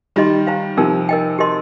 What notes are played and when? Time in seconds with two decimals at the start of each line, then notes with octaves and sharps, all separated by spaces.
0.16 D#3 G3 F4 D#5 C6
0.47 C5 F5 A#5
0.77 C3 F3 D#4 A#4 G5
1.09 A#4 D#5 G5
1.38 G4 A#4 D#5 C6